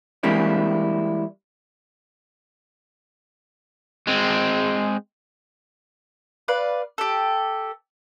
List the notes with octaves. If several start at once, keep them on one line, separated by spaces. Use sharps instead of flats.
E3 G3 G#3 A#3 C4 E4
G#3 C4
B4 D5 F5
G4 A4